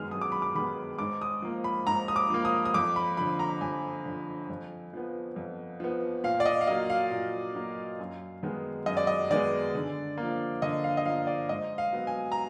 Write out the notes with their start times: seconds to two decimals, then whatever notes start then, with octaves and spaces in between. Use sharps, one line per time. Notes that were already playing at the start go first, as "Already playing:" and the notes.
Already playing: F#2 D#3 G#3 B3 F6
0.11 F#2 D#6
0.21 D6
0.32 B5
0.42 D6
0.55 D#3 G#3 B3 B5
0.99 G#2 D6
1.21 D#6
1.42 F3 A#3
1.64 B5
1.87 G#2 A#5
2.08 D#6
2.16 D6
2.30 F3 A#3
2.45 D#6
2.65 D#6
2.74 F2 D6
2.96 B5
3.17 D3 F3 B5
3.39 A#5
3.61 F2 G#5
4.06 D3 F3
4.50 F2
4.93 F3 B3
5.36 F2
5.80 F3 B3
6.24 A#2 F5
6.40 D5
6.46 D#5
6.61 F5
6.67 F#3 A#3 D#5
6.90 F5
7.11 A#2
7.55 F#3 A#3
7.99 F#2
8.43 D#3 G#3 B3
8.86 F#2 D#5
8.97 D5
9.07 D#5
9.31 D#3 G#3 B3 D5
9.75 D3
10.18 F3 A#3
10.62 D3 D#5
10.84 F5
10.97 D#5
11.05 F3 A#3 F5
11.27 D5
11.49 G#2 D#5
11.78 F5
11.93 F#3 B3
12.07 G#5
12.32 A#5